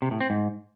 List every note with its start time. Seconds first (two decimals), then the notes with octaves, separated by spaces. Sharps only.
0.02 C3
0.11 A2
0.21 C4
0.30 G#2